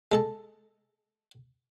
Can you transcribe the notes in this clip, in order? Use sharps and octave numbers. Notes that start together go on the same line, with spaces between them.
G#3 A4 A5